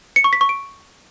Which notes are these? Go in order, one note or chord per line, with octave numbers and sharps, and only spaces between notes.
C#7
C#6
B6
C#6
D7